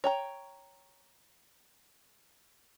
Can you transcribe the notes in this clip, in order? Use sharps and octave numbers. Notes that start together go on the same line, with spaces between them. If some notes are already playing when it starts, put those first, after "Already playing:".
C#5 G5 A#5